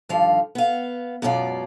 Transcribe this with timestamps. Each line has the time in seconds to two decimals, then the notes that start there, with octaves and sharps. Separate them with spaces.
0.09 G2 D3 D#3 F3 F5
0.55 B3 F5
1.22 F#2 B2 G#3 C#4 F4 D5